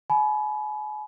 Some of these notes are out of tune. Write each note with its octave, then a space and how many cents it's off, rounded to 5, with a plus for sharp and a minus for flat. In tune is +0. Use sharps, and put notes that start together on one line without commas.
G#5 +40 B5 -5